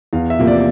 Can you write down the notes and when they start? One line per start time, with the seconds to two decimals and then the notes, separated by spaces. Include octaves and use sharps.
0.13 E2 F5
0.30 E5
0.39 C3 F3 A#3
0.47 D5